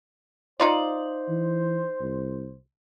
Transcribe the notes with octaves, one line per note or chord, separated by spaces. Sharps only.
D#4 F4 C5 D5
E3
C2